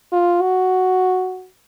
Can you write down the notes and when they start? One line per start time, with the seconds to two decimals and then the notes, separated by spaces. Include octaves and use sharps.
0.12 F4
0.41 F#4